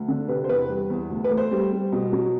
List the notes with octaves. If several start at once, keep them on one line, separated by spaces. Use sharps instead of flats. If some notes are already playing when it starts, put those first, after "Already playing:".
Already playing: D2
D3
C3 B4
C5
E2 B4
G3
E2
D2
B4
A3
C5
G3
G3
B2
F#3